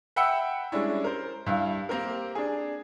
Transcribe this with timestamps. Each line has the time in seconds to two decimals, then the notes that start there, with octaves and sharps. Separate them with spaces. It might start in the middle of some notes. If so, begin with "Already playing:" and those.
0.16 E5 F#5 G5 B5 E6 C#7
0.72 G3 G#3 C#4 D4 E4
1.04 A#4 C5
1.46 G2 E4 F5
1.89 A#3 C4 G4 A#4
2.35 D4 G#4